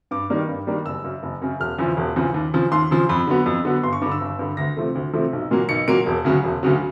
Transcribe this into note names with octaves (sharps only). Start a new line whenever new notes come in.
G2 D6
D#3 G3 A#3 D4
G2
D#3 G3 A#3 D4
F#1 E6
F#2 C#3
F#1
F#2 C#3
E1 F6
E2 C#3 F3
E1
E2 C#3 F3
D#2
C#3 F3
D#2 C6
C#3 F3
F2 B5
D3 F#3 B3
F2
D3 F#3 B3
G1 C6
C#6
G2 D3 D6
E6
G1
G2 D3
D2 A#6
C3 F3 A3
D2
C3 F3 A3
B1
A#2 F#3 A#3
B1 C#7
A#2 F#3 A#3 D7
E1
D2 C#3 F#3
E1
D2 C#3 F#3